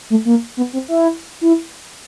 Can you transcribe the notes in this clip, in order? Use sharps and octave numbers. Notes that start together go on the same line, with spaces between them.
A3
A#3
B3
C4
E4
E4